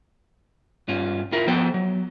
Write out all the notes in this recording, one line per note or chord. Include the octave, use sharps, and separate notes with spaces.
G2 C#4 F4
E4 F4 A#4
F3 B3 A4 C5 G5
F#3